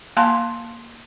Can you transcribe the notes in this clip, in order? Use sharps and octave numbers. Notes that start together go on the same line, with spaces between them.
A#3 F5 G#5 A5 C6